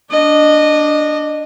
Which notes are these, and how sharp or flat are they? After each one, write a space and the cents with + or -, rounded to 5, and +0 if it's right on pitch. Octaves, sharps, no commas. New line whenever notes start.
D4 +0 D#5 -20